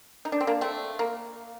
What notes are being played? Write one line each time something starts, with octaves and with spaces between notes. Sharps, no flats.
D#4
D4
C4
A#3 D4
A3 C4
A#3